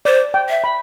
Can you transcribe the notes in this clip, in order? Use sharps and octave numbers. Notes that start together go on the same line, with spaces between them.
C5 D5
G5
E5
B5